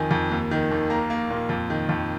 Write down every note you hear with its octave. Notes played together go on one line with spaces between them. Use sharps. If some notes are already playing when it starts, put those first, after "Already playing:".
Already playing: F2 D#3 G#5
F2
D#2
D#3
D#2
A#3 A#5
A#3
A#2
F2
D#3
F2